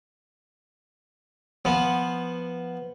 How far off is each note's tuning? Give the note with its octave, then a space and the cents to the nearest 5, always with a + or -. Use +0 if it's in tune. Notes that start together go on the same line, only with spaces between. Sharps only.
F3 +0 B3 +0